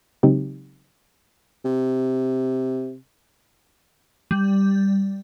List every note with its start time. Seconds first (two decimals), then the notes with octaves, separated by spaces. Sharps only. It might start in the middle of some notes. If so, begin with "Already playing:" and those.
0.23 C#3 F#3 G#3 C4 D#4 G4
1.65 C3
4.31 G3